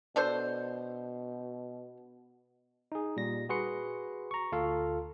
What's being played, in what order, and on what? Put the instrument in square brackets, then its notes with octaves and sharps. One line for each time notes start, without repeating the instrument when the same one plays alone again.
[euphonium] B2 [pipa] D4 A4 C5
[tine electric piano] D#4 G#4
A#2 G3 A#6
F#4 G#4 B4 C6 C#7
A#5 C#6
D2 F4 A4 F5